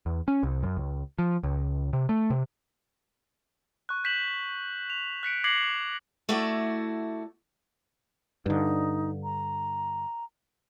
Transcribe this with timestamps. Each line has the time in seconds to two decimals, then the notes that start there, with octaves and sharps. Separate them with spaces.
0.06 E2
0.28 C#4
0.43 C2
0.63 F#2
0.77 C#2
1.19 F3
1.44 C#2
1.93 C3
2.09 A3
2.30 C3
3.89 C#6 F#6
4.04 G6 B6 E7 F#7
4.90 F7
5.23 F#6 B6 C#7 D7
5.44 D6 G#6 A#6 C7 C#7 F#7
6.29 A3 E4 F#4 D5
8.46 G2 D3 D#4
9.24 A#5